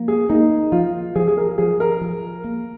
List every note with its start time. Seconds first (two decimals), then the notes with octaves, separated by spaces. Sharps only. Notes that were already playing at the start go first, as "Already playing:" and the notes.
Already playing: F3 A#3
0.08 G#4
0.29 A#3 D#4
0.72 F3 F4
1.16 F3 G#4
1.28 G#4
1.37 A#4
1.58 F3 G#4
1.80 A#4
2.01 F3
2.44 A#3